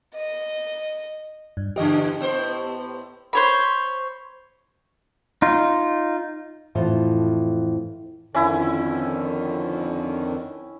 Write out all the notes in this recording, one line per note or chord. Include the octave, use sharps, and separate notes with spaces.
D#5
G2
E2 C#3 G4 D#5
A2 B3 C5
C5 C#5 B5
D#4 F4
F2 A2 E3 F4 C5
F2 D3 D#3 C#4 E4